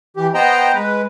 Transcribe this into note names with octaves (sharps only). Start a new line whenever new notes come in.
E3 G4
B3 C5 D#5 G5 A#5
G#3 B4